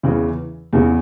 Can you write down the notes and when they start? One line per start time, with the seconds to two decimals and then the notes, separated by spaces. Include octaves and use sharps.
0.03 E2 C#3 E3
0.73 E2 C#3 E3